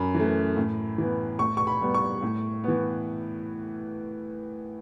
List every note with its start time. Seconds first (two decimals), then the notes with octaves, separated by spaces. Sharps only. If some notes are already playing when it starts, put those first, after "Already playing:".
Already playing: F#2 B5
0.15 E3 A3
0.57 A2
0.98 E3 B3
1.39 A2 C#6
1.57 C#6
1.67 B5
1.81 G3 B3
1.94 C#6
2.22 A2
2.64 E3 B3